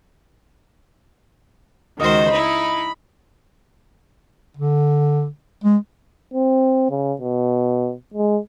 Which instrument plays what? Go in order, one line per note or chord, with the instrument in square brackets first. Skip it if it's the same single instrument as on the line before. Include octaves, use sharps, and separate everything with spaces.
[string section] C#2 D#3 [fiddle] F#4 C5 [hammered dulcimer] D#5
[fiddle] D#4 E4 [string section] B5
[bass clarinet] D3
G#3
[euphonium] C4
C#3
B2
G#3